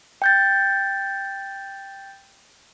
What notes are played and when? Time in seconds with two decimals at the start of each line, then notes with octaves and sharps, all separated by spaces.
0.22 G5 G6 A6